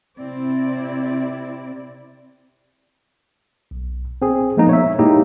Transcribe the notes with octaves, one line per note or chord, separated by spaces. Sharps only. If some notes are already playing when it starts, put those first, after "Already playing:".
C3 C4 E4 D5
B1
C4 G#4
F3 G#3 A#3 B3 D#4
C#5 E5
G#3 A#3 D#4 E4 G4